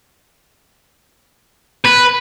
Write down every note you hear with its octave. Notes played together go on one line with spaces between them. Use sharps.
B4